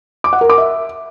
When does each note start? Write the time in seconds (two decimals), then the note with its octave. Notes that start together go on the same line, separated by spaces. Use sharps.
0.24 D6
0.33 F#5
0.41 A#4
0.50 D6
0.58 E5